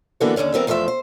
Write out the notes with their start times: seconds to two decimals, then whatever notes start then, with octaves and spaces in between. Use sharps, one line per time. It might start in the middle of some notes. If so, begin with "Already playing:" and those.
0.20 D3 E3 A#3 B3 F#4 A4
0.36 D#2 G#2 D3 C#4 D4
0.54 E3 G3 B3 C4 A#4
0.67 E2 F3 A3 C5 E5
0.88 C5